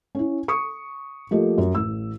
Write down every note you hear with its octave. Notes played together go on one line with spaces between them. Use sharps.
C#4 E4
C#6 D#6 C#7
F3 A3 A#3 G4 A4 D#5
F#2
A1 E6